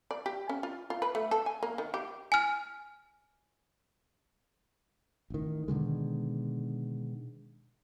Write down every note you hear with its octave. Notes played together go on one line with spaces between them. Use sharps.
D5
G4
C#4
F4
F4
B4
A3
A4
G#5
A#3
D#3
G4
G#5 F6
A1 D#3
B2 D3 D#3 G#3